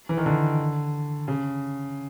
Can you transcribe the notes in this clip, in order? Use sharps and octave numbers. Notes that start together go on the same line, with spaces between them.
E3
D#3
D3
C#3